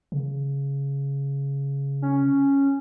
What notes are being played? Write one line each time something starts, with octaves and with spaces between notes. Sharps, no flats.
C#3
C#4